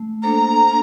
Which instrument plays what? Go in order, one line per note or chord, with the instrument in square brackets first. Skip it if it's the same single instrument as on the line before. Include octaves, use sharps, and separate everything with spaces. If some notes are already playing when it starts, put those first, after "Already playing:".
Already playing: [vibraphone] A3
[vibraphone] A#3 D4 A4 C5 [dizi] A#5